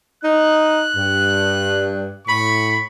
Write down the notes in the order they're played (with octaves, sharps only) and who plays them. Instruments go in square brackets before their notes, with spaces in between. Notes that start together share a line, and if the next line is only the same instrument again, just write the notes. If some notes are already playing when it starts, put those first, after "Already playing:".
[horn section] D#4 [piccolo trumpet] F#6
[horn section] G2
[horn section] A2 B5 [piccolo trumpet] C#6